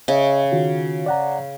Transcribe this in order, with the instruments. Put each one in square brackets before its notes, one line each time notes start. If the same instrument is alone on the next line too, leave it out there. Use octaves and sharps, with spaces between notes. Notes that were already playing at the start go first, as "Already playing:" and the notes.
[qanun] C#3 [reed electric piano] D#5 E5
[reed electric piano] D#3 F4 F#4
D5 F#5 A#5